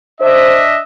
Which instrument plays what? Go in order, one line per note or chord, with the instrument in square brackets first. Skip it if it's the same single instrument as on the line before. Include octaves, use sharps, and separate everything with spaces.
[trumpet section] D4 D#5 E5 [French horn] C5